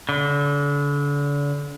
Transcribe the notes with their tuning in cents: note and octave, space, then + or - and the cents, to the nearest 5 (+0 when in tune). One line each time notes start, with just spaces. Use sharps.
D3 -35